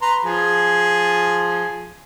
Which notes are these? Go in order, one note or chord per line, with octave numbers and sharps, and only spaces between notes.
B4 A#5 C6
F3 G#4